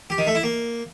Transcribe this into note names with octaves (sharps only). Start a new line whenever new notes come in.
G4
D#3
A3
E4
A#3